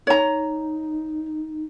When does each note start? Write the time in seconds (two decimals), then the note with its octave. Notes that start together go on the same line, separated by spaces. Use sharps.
0.07 D#4 C#5 A#5